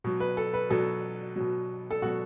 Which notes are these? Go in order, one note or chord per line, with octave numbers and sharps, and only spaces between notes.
B2 F#3
B4
A4
B4
B2 F#3 A4
B2 F#3
A4
B2 F#3 F#4